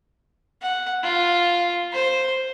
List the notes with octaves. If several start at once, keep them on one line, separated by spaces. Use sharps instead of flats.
F#5
F4
C5